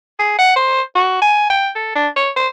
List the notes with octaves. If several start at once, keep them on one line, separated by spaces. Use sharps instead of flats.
G#4
F#5
C5
F#4
G#5
G5
A4
D4
C#5
C5